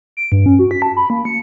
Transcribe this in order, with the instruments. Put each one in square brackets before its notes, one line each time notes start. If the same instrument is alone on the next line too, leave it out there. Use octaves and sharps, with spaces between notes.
[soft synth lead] D7
G2
C#4
F#4
B6
A5
B5
A#3
C#7